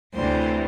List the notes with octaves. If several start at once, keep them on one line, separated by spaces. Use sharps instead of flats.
D2 C3 E3 G3 C5